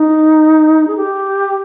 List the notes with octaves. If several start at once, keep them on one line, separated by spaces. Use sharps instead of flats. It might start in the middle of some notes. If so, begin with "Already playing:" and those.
Already playing: D#4
G#4
G4